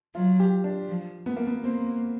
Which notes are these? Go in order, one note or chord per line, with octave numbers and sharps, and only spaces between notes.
F#3 F4
G4
D4
F3
A3 B3
A#3
B3
A#3 C4